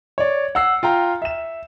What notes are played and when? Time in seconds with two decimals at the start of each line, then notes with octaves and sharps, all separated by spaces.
0.18 C#5 D5
0.55 F#5 E6 C7
0.83 F4 G5 A#5
1.22 E5 E7